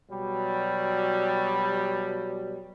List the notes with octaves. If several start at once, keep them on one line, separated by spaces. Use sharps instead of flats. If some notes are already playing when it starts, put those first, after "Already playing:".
B2 F#3 G3